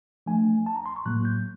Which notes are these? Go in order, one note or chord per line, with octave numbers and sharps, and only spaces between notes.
F3 A3 D4 G#5
A5
A#5
C6
C#6
A2 F#3 A#3 F#6
G6